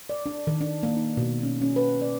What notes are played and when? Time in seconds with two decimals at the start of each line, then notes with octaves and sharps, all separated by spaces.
0.10 D5
0.26 D4
0.47 D#3
0.61 D4
0.83 A#3
0.97 D#4
1.17 B2
1.43 C#4
1.62 C#4
1.76 B4
2.02 D5